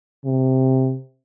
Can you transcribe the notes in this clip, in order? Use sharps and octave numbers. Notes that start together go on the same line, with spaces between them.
C3